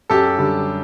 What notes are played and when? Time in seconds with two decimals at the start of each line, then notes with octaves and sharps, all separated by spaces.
0.10 F#2 G4 A4
0.38 D3 G3